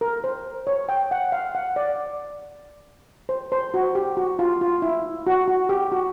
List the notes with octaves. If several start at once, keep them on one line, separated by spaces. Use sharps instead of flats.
A#4
C5
C#5
G5
F#5
F5
F#5
D5
C5
C5
F#4
G4
F#4
F4
F4
E4
F#4
F#4
G4
F#4